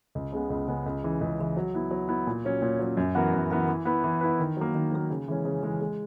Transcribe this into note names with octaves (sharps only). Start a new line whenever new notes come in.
C#2
C#3 G#3 B3
C#2
C#3 G#3 B3
C#2
C#3 E3
C#2
C#3 E3
F#3
B3 E4
F#3
B3 E4
A#2
F#3 C#4
A#2
F#3 C#4
F#2
E3 B3 F#4 A#4
F#2
E3 B3 F#4 A#4
E3
B3 E4 B4
E3
B3 E4 B4
D#3
F#3 A#3
D#3
F#3 A#3
C#3
E3 G#3 C#4
C#3
E3 G#3 C#4
G#3